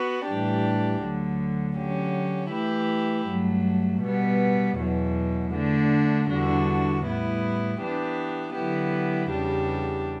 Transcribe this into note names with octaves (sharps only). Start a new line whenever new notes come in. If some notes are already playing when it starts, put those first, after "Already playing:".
Already playing: B3 F#4
A2 E3 G3 D4 G4
D2 D3 F#3
D3 F#3 C#4 G4
E3 A3 E4 G4
G2 F#3 A3
B2 G3 B3
E2 B2 F#3
D3 A3 D4
E2 D3 G3 D4 F#4
A2 G3 B3 E4
E3 B3 D4 G4
D3 F#3 B3 E4 G4
E2 C#3 G3 D4 G4